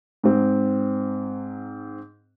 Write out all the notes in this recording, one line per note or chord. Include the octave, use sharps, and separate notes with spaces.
G#2 C4